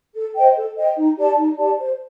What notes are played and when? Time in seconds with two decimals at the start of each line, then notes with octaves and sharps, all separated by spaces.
0.15 A4
0.36 C5 D#5 G5
0.55 A4
0.77 C5 D#5 G5
0.96 D#4
1.17 G4 D5 A5
1.37 D#4
1.58 G4 D5 A5
1.78 C5